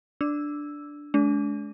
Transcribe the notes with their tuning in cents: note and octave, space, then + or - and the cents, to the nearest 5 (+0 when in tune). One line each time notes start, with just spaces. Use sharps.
D4 +0 E6 +0
G#3 +35 D4 -35